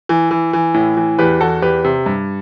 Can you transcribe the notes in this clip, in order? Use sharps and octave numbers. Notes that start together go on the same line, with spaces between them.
E3
E3
E3
A2
E3
E2 G4 B4
E2 F#4 A4
E2 G4 B4
C3
G2